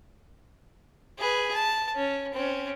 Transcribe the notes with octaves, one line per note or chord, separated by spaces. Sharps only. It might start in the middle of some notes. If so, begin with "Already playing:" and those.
G#4 B4
A5
C#4
C4 C#4